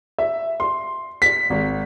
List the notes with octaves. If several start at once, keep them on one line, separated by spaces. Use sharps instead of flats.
E5
C6
B6
G#1